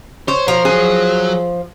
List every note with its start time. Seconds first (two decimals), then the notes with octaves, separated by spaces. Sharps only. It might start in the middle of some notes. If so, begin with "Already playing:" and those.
0.28 C5 C#5
0.48 F3 A#4
0.65 F#3 G#4